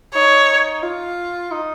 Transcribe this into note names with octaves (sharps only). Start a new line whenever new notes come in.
D#4 C#5
F4
D#4